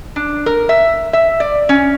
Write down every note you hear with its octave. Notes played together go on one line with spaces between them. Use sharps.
D4
A#4
E5
E5
D5
C#4